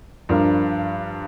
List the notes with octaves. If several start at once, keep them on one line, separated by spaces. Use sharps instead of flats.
G2 F3 D4 A#4